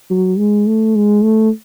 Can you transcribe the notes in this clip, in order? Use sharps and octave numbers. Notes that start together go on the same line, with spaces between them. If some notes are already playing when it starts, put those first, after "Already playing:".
F#3
G#3
A3
G#3
A3